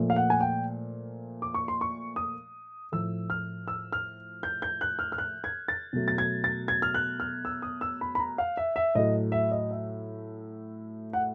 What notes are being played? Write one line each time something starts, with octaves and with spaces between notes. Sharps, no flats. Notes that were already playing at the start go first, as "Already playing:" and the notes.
Already playing: A#2 F3 A3
F5
F#5
G#5
G5
D6
C#6
C6
C#6
D#6
A2 F3 A3 E6
F6
E6
F6
G6
G6
F#6
F6
F6
F#6
G#6
A6
B2 F#3 A3
A6
G#6
A6
G#6
F6
F#6
F6
E6
D#6
E6
B5
B5
A#5
F5
E5
E5
A2 F#3 A3 D#5
E5
D#5
E5
F#5